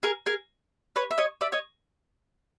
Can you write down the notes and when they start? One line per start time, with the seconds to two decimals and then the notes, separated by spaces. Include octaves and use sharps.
0.03 G#4 A#4
0.26 G#4 A#4
0.96 B4 C#5
1.11 E5
1.18 C#5 D#5
1.41 D5 E5
1.52 C#5 D#5